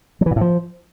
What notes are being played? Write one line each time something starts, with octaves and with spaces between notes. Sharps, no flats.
F#3
E3
A#2
A2
F3